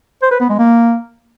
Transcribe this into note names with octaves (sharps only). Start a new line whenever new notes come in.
C5
B4
B3
G#3
A#3